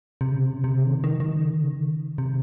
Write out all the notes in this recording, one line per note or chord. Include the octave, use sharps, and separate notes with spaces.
C3
C#3
C3
C#3
C3
C#3
D#3
D#3
D#3
C#3
D#3
C#3
D#3
C3